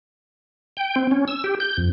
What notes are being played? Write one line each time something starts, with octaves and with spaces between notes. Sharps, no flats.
G5
C4
C#4
E6
G4
G6
F2